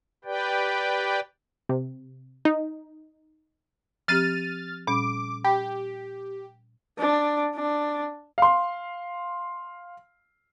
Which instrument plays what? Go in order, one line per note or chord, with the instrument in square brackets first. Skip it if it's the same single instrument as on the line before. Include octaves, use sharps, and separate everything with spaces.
[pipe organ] G4 B4 D5 G5
[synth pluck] C3
D#4
[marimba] F3 C4 G4 [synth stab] F6 A6 D#7
[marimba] A#2 G3 C#4 [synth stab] D6
[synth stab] G4 [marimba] B5
[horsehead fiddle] D4
D4
[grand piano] F5 C6